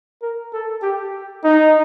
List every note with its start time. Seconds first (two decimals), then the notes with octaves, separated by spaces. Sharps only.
0.22 A#4
0.53 A4
0.83 G4
1.44 D#4